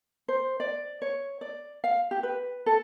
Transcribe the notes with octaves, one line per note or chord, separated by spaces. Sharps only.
C5
D5
C#5
D5
F5
G4
B4
A4